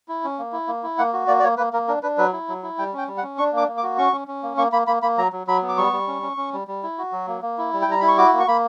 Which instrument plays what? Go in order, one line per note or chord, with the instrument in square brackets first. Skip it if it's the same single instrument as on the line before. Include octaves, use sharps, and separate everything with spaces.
[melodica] E4
C#4
A#3
E4
A#3
E4
A#3 F#5
F#4
A#3 D5
D5
A#3 C#5
A#3 B4
A#3 A#4
D4 A#4
D4 B4
F#3 B4
E4
F#3
E4
G3 G5
C#4 G5
G3
F#5
C#4
D4 C#6
A#3
D6
A#3
D6
F#4
C#4 C#6
C#4
C#4
A#3
A#3 C#6
A#3 B5
A#3 B5
A#3 B5
F#3 A#5
F#3
F#3 B5
B3
D6
G3 C#6
G3
C#4
C#4
C#4
G3
G3
E4
F#4
F#3
A#3
A#3
E4
G3
G5
G3 A#5
E4 B5
C#6
F#4 D6
A#3
C#6
A#3 B5